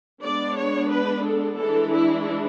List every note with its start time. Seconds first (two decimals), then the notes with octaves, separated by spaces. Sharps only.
0.22 G#3 B3 D4 D5
0.56 C#5
0.90 B4
1.24 A4
1.58 E3 G#3 D4 A4
1.93 E4